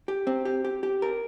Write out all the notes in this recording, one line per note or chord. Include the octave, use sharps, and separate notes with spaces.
G4
C4
G4
G4
G4
A#4